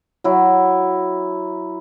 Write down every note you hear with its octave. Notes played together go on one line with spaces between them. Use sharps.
F#3 E4